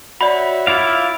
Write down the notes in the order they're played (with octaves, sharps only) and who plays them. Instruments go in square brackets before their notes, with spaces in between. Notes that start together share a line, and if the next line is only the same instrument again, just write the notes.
[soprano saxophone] F#4 [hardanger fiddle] C#5 E5 [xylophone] D5 B5
[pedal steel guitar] E4 F4 F5 [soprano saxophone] D6